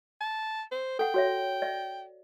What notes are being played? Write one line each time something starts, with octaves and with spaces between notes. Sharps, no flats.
A5
C5
A4 F#5 G5
F#4 C#5 E5
D5 E5